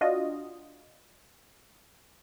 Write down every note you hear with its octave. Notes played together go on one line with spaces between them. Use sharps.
D4 F4 F#4 D#5